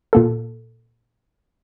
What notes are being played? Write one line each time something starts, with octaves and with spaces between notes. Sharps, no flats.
A#2 A#3 A4